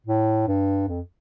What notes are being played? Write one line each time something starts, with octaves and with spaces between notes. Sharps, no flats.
A2
G2
F2